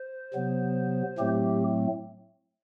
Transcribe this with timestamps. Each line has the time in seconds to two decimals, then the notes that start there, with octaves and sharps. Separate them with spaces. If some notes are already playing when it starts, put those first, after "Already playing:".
Already playing: C5
0.34 C3 F#3 B3
1.19 A2 F#3 A3 C4 G4